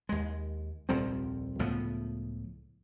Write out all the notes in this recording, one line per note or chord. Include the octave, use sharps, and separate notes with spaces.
D#2 G#3
D#1 C2 F3 C4
C#2 A2 F3 B3